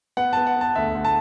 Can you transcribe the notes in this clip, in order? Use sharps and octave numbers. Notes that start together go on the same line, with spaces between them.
B3 F#5
B3 A5
F#5
B3 A5
D2 E5
D2
A5